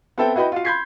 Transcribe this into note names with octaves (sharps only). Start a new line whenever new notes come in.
B3 C4 A4 E5 G5
E4 F#4 B4 D#5 G5 B5
F4 F#4 F5
B5 C6 G6 G#6 B6 C7